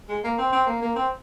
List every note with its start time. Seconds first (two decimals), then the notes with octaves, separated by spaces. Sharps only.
0.09 G#3
0.24 A#3
0.38 C4
0.52 C4
0.67 A#3
0.82 A#3
0.96 C4